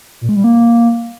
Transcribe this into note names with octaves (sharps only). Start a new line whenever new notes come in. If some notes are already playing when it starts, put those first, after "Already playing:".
A#2
G#3
G3
A#3